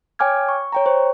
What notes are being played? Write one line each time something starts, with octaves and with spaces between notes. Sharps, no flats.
C#5 G5 G#5 D6 F6 G#6
C#6
C#5 G5 A#5
C5 C#6